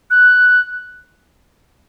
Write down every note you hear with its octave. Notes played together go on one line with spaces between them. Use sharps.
F#6